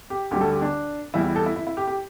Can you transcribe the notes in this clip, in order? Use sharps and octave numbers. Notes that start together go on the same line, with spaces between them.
G4
D2 D3 G3 G4
A4
G4
D4
E2 E3 G3 E4
E4
A4
E4
E4
E4
G4
G4